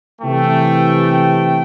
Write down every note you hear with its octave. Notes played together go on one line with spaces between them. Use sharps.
C3 E3 A3 G5